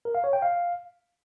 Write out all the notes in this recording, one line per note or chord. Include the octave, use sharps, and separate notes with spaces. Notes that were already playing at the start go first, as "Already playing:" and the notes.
A#4
F5
C#5
G5
F5